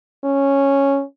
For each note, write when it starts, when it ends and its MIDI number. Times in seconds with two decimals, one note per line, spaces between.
0.24 1.03 61